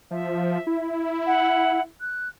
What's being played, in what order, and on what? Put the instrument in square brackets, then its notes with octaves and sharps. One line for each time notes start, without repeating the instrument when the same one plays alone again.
[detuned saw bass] F3 [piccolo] E5
[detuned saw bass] E4
[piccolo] F#5
F#6